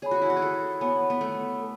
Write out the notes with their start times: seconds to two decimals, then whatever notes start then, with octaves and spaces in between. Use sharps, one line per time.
0.02 G#4 C#5 G#5 B5
0.11 F#4
0.22 E4
0.30 F#4
0.36 G#4
0.42 A4
0.81 B3 C#5 G#5 B5
1.10 B3
1.21 A3
1.60 A4